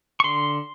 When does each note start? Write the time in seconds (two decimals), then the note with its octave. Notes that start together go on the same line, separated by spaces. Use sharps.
0.20 C#6
0.24 D3 C6